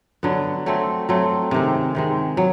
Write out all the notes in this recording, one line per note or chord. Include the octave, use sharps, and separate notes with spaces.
D3 F#3 B3
F#3 A3 C4
F#3 A3 C4
C3 D#3 G#3
C3 D#3 G#3
F#3